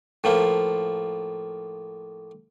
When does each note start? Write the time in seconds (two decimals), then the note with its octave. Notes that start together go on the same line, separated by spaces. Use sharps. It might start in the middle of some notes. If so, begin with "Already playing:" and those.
0.24 A2 F3 A#3